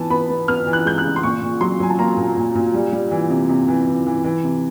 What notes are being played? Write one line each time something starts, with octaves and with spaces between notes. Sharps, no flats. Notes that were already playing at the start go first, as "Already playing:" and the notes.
Already playing: E3 B3 A5
B3 B5
B3
B3 F6
E3
F#6
G#3 G6
F#6
C#3
C6
A#2 C#6
A#2
F#3 C6
F#3 G#5
A5
A#3 A#5
A#2
A#2
A#2
G3
G3
E3
C3
C3
E3
E3
E3
E3
C3